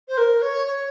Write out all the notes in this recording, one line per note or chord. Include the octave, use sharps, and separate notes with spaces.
C5
A#4
C#5
C#5